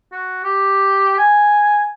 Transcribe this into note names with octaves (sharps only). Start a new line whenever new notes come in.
F#4
G4
G#5